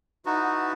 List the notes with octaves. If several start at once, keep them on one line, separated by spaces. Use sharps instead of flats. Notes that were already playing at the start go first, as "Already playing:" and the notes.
D#4 E4 F#4 B4 F#5 A5